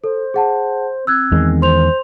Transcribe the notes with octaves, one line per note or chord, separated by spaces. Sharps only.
A4 C5
G#4 F#5 A5
C4 E6 F#6 G#6
E2 D#3 G#3
C5 C6 F7